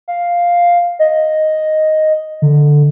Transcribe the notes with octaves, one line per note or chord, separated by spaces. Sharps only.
F5
D#5
D3